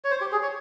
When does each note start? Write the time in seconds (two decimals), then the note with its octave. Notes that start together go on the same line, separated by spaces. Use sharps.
0.04 C#5
0.11 C5
0.21 G4
0.32 G#4
0.43 C#5